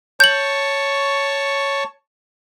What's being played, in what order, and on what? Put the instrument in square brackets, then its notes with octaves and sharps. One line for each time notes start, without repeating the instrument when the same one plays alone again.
[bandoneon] C#5 A5 C#6 [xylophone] G6 F#7